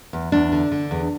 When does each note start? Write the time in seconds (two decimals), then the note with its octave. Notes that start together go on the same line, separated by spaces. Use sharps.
0.13 E2
0.32 E2 D4
0.52 D3
0.71 D3
0.91 E2